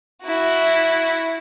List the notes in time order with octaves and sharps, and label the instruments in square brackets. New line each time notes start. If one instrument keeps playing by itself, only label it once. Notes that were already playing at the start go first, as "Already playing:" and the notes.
[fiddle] E4 F#4